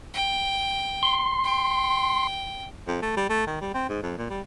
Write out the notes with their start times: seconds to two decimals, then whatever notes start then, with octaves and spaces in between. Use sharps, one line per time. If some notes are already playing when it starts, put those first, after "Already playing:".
0.14 G5
1.03 C6
1.44 G5
2.87 F2
3.02 A3
3.17 G3
3.29 A3
3.47 D#3
3.61 G3
3.74 C4
3.89 G#2
4.03 F2
4.18 A#2
4.30 G3